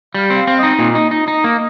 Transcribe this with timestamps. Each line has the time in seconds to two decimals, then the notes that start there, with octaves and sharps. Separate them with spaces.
0.15 G3 F5
0.30 C4
0.36 F5
0.47 C4
0.57 D#5
0.63 D#4
0.79 A#2 D#5
0.95 D#4
1.11 D#4
1.28 D#4
1.44 A#3